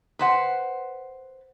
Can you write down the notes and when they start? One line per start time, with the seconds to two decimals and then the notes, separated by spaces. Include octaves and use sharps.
0.19 B4 C5 F#5